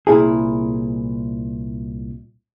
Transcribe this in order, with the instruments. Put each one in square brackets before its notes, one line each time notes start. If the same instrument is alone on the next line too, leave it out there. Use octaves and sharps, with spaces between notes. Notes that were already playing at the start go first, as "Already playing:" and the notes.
[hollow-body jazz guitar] C2 A#2 E4 G#4